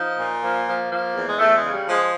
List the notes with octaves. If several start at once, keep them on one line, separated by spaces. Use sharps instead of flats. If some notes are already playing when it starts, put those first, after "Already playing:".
Already playing: F3 D#4
A#2
F3 A#3
F3
F3
E2
G#3
E2 A3
G#3
C#3
G3
F3 G#3